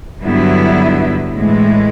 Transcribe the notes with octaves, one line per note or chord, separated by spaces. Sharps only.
G2 D3 F#3 B3 E4
A2 E3 G#3